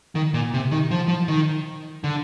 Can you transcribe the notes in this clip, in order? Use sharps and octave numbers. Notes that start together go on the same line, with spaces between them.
D#3
A#2
C3
D#3
F3
F3
D#3
D3